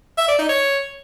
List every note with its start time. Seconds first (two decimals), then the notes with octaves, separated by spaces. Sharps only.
0.18 E5
0.28 D5
0.39 D#4
0.49 C#5